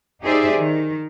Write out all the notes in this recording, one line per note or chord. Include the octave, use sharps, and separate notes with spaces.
D#4 G4 G#4 C5 D5 E5
D#3